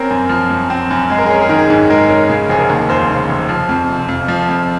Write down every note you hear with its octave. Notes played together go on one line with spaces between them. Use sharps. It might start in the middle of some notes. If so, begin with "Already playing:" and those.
Already playing: C4 C#4 A#4
F#2
F3
F#2
C4
F#2
G#3 G#4
A#4
G#4
C#4 A#4
G#4
D#3 A#4
G#4
G#2 G#4
G#3 A#4
C#4 A#4
C#3 G#4
F1 G#4
A#4
D#2
F1 G#4 C5
C#3
F1
F3
F2
C3
F2
F3
F2